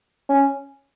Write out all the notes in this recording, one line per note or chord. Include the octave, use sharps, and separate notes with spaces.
C#4